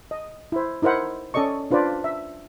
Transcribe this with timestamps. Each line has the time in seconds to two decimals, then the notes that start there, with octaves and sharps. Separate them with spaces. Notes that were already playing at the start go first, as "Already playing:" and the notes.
0.11 D#5
0.52 E4 C5
0.82 D#4 E4 A#4 C5 F#5
1.34 C#4 A4 D5 D#5 C#6
1.71 D4 F4 B4 C5 D5
2.04 E5